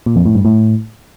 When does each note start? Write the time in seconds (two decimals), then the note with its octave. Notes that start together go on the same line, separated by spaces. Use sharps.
0.06 A#2
0.16 F2
0.26 A2
0.35 G2
0.45 A2